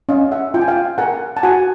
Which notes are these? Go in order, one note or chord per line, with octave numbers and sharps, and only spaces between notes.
C#4 D#5 F5
E5 F#5
F4 G5
G#5
F5 G5
A#4 F#5 G#5
A5
F#4 F#5 G#5